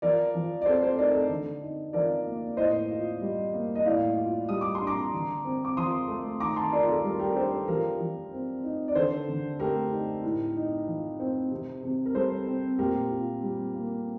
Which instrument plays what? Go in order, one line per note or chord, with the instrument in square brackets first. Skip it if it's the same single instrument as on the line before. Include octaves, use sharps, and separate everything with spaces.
[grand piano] F3 A#4 D5
F3
D5
C4 A4 C5
A4 C5
D#4 A#4 D5
A4
D3
D#4
F3 A#4 D5
A#3
A2 C5 D#5
F4
G3
A#3
D#5
A2 D5 F5
F4
G3 D#6
D6
C6
D4
A#5 D6
D3
C4
D6
F3 C6 D#6
A3
D#3 A#5 D6
A5 C6
F4 A#4 D5
A4
G3 A#4
A4
G4 A#4
D4 A4 C5
F3 G4 A#4
F3
C4
D#4
D5
D3 A4 C5
D3
A3 G4 A#4
D#4
A2
D#4
F3
C4
C3
C3
A#4
G3 A4 C5
C4
A#2 G4 A#4
F4
G3
A#3